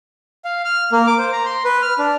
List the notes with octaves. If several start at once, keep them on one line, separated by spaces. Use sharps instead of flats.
F5
F6
A#3
D6
C5
A#5
C6
B4
F6
D4